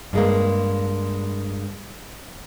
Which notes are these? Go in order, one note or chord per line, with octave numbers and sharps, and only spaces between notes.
G2 G#3 A#3